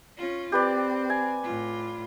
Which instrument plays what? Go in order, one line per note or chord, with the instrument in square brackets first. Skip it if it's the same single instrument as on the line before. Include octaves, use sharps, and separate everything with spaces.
[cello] C#4 F4
[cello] C4 [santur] G4 B4 D5
[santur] G#5
[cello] A2 F4